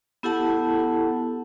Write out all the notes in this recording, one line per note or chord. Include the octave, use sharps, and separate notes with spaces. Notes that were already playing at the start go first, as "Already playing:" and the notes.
B3 E4 G4 A4 F#5 A5